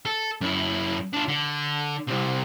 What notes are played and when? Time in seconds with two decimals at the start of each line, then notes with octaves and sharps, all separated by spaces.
0.06 A4
0.41 F#2 E4
1.13 D4 F4
1.28 D3
2.08 C2 C3